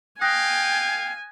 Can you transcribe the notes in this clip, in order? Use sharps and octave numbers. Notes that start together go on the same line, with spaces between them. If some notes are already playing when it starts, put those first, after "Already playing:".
F5 G5 G#5 D#6 F#6 A#6